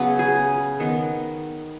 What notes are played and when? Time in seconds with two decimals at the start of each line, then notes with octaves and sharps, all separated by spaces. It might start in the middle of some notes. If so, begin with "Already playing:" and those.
Already playing: C#3 F#3 B3 B4
0.19 G#4
0.80 D#3 B3